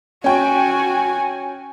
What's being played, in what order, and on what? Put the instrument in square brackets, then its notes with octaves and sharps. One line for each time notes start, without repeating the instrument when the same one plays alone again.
[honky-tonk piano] C#4 G5 C#6 [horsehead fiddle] F#4 G#5